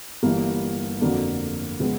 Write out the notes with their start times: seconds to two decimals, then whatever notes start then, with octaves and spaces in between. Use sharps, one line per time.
0.23 G1 G2 E3 G3 A#3
1.01 F2 D3 F#3 A#3 D4
1.80 C#3 F3 G#3 B3